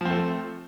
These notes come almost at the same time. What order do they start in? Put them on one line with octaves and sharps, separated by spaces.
F3 C4 A3